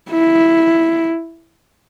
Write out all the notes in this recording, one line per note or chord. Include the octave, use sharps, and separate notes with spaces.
E4